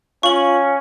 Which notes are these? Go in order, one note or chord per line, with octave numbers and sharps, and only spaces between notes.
C#4 F4 C#6 F#7